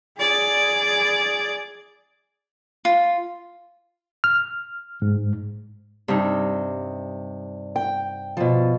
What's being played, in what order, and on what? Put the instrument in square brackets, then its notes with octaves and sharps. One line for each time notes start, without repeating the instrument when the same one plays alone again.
[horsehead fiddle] G#4 D5
[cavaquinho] F4
[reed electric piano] F6
G#2
[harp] G2 C3 D#4
[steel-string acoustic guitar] G5
B2 F3